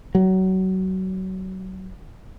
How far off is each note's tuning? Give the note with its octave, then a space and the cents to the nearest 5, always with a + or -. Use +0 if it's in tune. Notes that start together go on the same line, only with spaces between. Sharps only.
F#3 +25